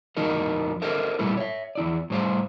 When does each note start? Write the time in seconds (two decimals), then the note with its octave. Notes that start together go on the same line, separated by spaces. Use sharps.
0.17 F2 F3 D#4 F#4 A#4 D#5
0.82 G4 A4 A#4 C5 D#5 E5
1.19 A#2 G3 A3 E4 B4
1.37 C#5 E5
1.75 E2 E4 D5
2.10 A2 G3 C5 F5